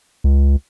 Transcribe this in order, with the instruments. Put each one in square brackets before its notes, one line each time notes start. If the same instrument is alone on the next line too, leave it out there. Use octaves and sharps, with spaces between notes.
[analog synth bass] C#2